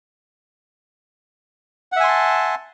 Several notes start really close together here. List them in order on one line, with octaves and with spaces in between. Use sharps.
F#5 E5 G#5 C6 A5